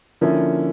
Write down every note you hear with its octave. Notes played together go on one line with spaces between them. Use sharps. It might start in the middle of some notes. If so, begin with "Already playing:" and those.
D3 F3 A#3 C#4 E4